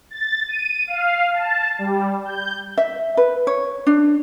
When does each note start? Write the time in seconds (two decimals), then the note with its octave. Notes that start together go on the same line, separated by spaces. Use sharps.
0.10 A6
0.48 D#7
0.87 F5
1.33 A5
1.79 G3
2.25 G6
2.78 E5
3.17 B4
3.47 C#5
3.87 D4